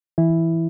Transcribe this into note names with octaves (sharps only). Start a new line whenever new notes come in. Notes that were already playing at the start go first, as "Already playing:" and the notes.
E3 E4